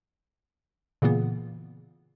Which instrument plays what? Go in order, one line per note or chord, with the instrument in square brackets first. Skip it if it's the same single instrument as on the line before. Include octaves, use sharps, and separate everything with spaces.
[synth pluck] A#2 C#3 E3 A#3 B3